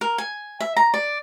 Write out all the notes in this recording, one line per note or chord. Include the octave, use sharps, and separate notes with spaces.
A#4
G#5
E5
A#5
D5